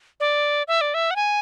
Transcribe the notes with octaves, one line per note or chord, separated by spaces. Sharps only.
D5
E5
D5
E5
F#5
G#5